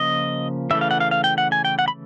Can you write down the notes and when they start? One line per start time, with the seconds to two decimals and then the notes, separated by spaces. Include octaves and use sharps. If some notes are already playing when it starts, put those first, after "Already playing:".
Already playing: C#3 F3 A#3 D#5
0.70 C#3 E3 A3 E5
0.81 F5
0.91 F#5
1.00 F5
1.11 F5
1.24 G5
1.38 F#5
1.52 G#5
1.65 G5
1.79 F#5
1.88 B5